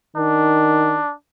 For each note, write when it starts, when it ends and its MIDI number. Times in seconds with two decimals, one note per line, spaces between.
0.17 0.98 51
0.17 1.14 62